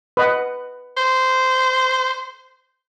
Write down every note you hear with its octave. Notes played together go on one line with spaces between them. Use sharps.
B4 D#5 F#5
C5